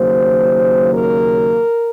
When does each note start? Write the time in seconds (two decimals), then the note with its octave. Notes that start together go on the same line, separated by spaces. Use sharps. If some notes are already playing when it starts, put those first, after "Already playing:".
Already playing: D#2 C#3 F#3 A#3 C5
0.94 A#4